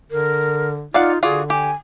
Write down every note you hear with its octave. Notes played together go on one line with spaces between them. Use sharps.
D3 A#4
D#4 F4 D5 F5 F#5
D3 F4 F#4 G#4 D5
G4 G#5